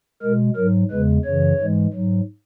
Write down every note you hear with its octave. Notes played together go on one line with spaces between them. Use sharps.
B2 G#3 A#4
G#2 F#3 A#4
E2 C#3 G#3 B4
F#2 C#3 E3 C#5
G#2 E3 G#3
G#2 F#3